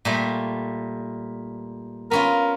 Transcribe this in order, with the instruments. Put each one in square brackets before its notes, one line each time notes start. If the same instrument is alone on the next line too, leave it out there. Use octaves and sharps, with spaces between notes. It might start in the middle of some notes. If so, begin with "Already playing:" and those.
[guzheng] A#2 G3 A3
[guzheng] B3 C#4 F4 [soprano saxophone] A#4